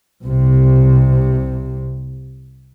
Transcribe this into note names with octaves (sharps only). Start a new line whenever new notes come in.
C2 C3